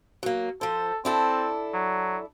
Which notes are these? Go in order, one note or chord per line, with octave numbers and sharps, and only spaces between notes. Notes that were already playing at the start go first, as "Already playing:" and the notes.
F#3 A#3
F3 A4 C5
C4 D4 E4 A4
F#3